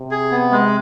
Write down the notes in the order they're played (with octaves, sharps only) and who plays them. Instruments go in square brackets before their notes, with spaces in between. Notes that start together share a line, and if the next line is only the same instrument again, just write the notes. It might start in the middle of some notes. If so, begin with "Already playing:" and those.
Already playing: [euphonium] C3
[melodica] G#4
B3
G#3